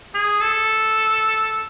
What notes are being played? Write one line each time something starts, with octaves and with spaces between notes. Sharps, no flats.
G#4
A4